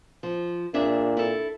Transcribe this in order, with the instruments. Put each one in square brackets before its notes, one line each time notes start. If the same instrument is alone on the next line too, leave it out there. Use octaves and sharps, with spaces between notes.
[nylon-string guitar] F3
[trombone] A#2 [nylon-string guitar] D4 G#4 E5
[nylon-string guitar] E4 A4